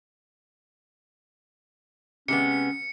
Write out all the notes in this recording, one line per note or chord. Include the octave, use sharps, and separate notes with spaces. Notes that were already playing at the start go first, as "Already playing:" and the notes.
C3 G#3 B3 C#4 C#7